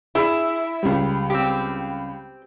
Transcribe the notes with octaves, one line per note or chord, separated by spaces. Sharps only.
E4 G#4
C#2 G3
C4 G4